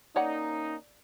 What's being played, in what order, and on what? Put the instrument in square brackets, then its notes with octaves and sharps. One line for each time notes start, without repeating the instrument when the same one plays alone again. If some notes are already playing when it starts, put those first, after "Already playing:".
[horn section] A#3 C#4 D#4 [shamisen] C#5 D5 F#5